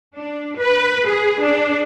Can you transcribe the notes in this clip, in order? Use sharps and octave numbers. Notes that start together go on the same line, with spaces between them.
D4
B4
G#4
D4